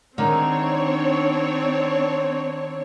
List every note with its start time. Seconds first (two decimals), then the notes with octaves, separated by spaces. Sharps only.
0.18 D3 D#3 G#3 C4 D4 C#5